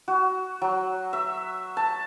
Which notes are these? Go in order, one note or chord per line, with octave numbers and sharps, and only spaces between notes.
F#4
F#3
E5
A5